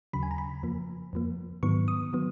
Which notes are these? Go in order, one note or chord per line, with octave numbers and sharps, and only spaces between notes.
D#2 C#3 F#3 B5
G#5
A#5
B5
F2 F3 A#3
F2 F3 A#3
G#2 D#3 F#3 B3 C#6
D#6
D#3 F#3 B3